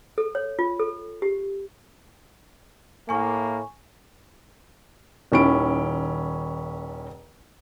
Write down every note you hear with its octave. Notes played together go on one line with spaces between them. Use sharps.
A4
C#5
F4
A4
G4
A2 A#3 G#5 C#6
D#1 D#3 C#4 E4 D7